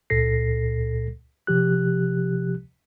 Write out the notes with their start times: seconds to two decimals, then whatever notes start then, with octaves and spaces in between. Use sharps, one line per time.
0.10 C#2 A#2 A4 A#6 C7
1.47 C3 F3 G4 F#6